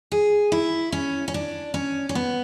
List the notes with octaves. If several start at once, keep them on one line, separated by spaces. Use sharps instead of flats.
G#4
E4
C#4
C#4
D4
C#4
C#4
B3